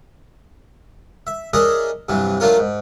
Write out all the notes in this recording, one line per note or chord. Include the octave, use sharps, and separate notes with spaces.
E5
D4 G#4 A#4 C#5 D#5 E5
G2 C3 E3 F#3
F#3 A3 D4 F4 A#4 C#5
G#2